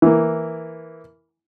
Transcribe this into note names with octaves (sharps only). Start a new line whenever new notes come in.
E3 A#3